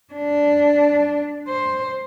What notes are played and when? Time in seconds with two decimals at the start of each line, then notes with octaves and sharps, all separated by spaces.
0.14 D4
1.48 C5